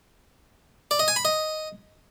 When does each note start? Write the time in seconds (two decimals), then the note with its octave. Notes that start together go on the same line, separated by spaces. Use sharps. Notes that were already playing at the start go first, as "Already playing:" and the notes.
0.91 D5
0.99 D#5
1.08 G#5
1.16 B5
1.25 D#5